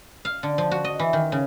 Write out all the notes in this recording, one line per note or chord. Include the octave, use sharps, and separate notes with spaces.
F5
D3
F3
F#4
D#5
E3
D#3
C#3